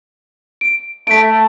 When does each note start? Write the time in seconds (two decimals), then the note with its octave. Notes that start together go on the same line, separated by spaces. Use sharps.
0.61 D7
1.07 A3 B6 D7